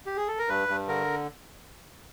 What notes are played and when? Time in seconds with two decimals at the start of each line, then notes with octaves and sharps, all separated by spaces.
0.06 G4
0.17 G#4
0.28 A4
0.39 A#4
0.49 G2 B4
0.68 G2
0.88 D3 A#4